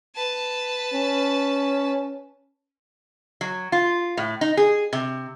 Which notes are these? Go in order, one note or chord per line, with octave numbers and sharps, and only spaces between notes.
B4 A5
C#4
F#3
F4
A2
D#4
G#4
C3